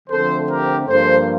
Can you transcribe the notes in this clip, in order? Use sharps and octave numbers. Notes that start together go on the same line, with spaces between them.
D3 F3 A3 C4 A4 C5
G4 A#4
G2 F3 A#3 A4 C5